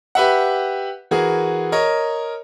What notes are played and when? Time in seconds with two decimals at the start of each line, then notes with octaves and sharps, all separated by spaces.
0.15 G4 B4 E5 F#5
1.11 E3 F#4 G#4 A#4
1.72 A#4 C#5 D#5